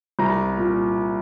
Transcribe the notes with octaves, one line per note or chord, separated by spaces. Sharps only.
C2 A#5
A#2